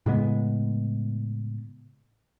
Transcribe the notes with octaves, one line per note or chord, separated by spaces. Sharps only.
A2 C#3 G#3 B3